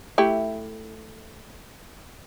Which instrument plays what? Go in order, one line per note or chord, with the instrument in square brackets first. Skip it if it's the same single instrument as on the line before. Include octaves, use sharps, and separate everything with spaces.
[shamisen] A3 E4 G4